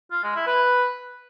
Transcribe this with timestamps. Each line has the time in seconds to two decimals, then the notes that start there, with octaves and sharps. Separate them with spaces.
0.12 F4
0.24 G#3
0.35 E4
0.47 B4